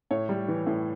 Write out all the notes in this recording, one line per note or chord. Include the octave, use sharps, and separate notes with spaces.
A2 C#5
G3
E3
A2